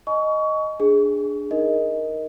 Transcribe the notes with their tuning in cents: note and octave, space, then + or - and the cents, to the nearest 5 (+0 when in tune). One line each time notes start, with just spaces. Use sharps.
D#5 +0 G#5 +35 C#6 +25
D4 +0 G#4 +0
D#4 +0 A#4 +5 D#5 +15